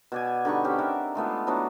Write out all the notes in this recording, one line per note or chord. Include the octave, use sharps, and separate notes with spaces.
B2 D5 G#5
D3 G3 D#4 C#6
C4 C#4 G4 B4
A#4 D5 E5 F#5
G#3 A3 B3 F4
E3 F#3 B3 D4